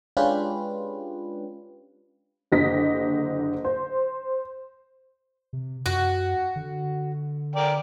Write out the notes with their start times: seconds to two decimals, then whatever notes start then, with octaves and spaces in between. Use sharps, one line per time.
0.17 G#3 C#4 D4 F4 G4 B4
2.52 F#1 D3 G4 D#5 A#6 B6
3.65 C5
5.53 C3
5.86 F#2 F#4
6.56 D3
7.56 A#4 D5 G5